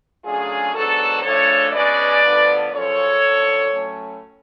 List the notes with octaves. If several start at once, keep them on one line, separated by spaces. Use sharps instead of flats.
C#3 F#3 A3 D4 F4 G#4
G#2 F#3 B3 D4 F#4 A4
D2 C#3 F3 A3 D4 A4 C#5
B2 G#3 C#4 B4 D5
D2 D3 F3 B3
F#2 C#3 F3 A4 C#5
F#2 D3 F3
A2 F#3 A3 C#4